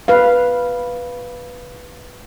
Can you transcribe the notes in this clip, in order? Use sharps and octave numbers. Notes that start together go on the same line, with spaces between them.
B4 F5